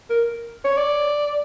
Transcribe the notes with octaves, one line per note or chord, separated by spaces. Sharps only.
A#4
C#5
D5